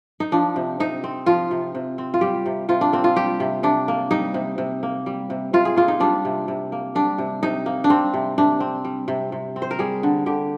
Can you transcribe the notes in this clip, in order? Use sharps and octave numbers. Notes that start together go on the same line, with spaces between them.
D#4
F3 D4
C3
C3 D#4
C4
F3 F4
C3
C3
C4
F4
G3 G4
C3
C3 F4
D4
A#3 C4
F4
G3 G4
C3
C3 D4
A#3
G3 D#4
C3
C3
A#3
G3
C3
C3 F4
G#4
A#3 F4
D#4
G3 D4
C3
C3
A#3
G3 D4
C3
C3 D#4
A#3
D4
G3 C4
C3
C3 D4
C4
G3
C3
C3
C4
C5
A#4
G3 G#4
D3
D3 G4